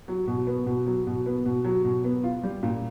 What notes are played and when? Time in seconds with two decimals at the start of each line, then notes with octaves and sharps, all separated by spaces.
0.08 F#3
0.28 B2
0.47 B3
0.67 B2
0.86 F#3
1.07 B2
1.26 B3
1.46 B2
1.65 F#3
1.85 B2
2.04 B3
2.23 F4
2.43 G3
2.63 A#2